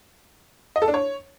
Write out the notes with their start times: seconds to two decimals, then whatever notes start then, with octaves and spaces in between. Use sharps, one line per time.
0.76 D#5
0.82 A4
0.88 D4
0.94 C#5